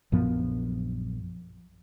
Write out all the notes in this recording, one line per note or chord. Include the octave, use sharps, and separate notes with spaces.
A#1 F#2 F3 B3